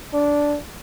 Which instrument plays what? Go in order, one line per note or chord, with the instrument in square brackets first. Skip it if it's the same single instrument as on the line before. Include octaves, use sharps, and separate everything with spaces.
[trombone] D4